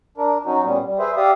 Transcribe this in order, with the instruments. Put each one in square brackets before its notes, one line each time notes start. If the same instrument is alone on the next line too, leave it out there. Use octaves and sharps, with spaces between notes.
[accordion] D4 A#4
F#3 C#4 D#4 F#4
A#2 G3 B3 C#4
G3
G#4 B4 C5 E5
G4 D5 E5 F5 D#6